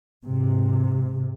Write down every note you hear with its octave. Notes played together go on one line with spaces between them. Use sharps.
G#2 C3